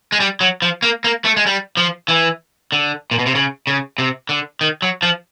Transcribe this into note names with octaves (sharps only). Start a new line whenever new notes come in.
G#3
G3
F#3
F3
A#3
A#3
A3
G#3
G3
F3
E3
D3
A#2
B2
C3
C#3
C#3
C3
D3
D#3
F#3
F3